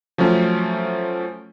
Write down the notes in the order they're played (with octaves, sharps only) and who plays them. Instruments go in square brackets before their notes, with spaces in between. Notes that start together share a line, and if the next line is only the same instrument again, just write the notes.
[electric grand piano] F3 F#3 A3 C#4